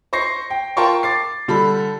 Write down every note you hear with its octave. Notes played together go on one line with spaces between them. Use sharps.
C5 C#6 A#6 C7
G5
F4 A#4 G5 A5 C6 C#6
D6 A6 C7
D3 G3 A4 B5